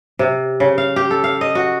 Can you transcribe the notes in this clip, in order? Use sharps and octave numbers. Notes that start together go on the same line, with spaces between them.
C3
C#3
F5
G4
A4
F5
D#5
F#4